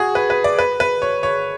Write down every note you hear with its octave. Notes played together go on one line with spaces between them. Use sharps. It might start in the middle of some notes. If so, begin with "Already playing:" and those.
Already playing: F#4 G#4
B4
B4
D5
B4
B4
C#5
C#5